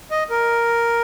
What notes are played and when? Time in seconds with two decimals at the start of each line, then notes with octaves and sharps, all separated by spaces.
0.11 D#5
0.30 A#4